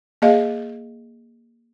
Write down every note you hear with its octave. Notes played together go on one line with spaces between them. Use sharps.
A#3 G#4 D#5 F5